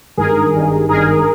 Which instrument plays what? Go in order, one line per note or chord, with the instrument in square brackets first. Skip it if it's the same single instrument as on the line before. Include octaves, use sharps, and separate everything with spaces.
[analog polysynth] G#1 G2 D#3 G#4 A#4
G#1 G2 D#3
G#1 G2 D#3 G#4 A#4